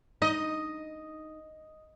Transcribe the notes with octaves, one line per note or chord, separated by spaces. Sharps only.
D#4 D#5